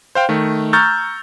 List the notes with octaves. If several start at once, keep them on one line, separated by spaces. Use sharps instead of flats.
C5 F5 G5
D#3 A3
A#5 C#6 E6 F6 G6 A6